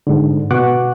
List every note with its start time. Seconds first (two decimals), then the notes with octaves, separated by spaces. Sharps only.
0.07 G#2 D3
0.51 B2 F#5 C#6 D6 F#6